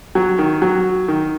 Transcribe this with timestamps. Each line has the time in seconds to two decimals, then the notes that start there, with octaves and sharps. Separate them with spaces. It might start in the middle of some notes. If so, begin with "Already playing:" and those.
0.15 F#3
0.38 D#3
0.62 F#3
1.08 D#3